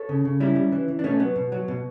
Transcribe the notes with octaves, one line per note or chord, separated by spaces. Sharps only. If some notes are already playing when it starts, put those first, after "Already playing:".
Already playing: A4 C#5
C#3
C#3
G3 C#4 E4
G3
E3
E3
D4
B2 A3 C#4
F#3 B3
B2
F#3
B2